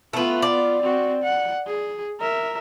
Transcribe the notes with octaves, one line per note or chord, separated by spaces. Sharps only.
A3 B3 F4 B4
D5
C4 F#4
F#5
G#4
A#4 E5